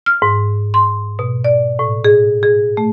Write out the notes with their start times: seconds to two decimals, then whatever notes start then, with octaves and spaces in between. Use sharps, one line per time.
0.06 F6
0.22 G#2
0.74 C6
1.19 B2
1.44 D5
1.79 A2
2.04 G#4
2.43 G#4
2.77 A3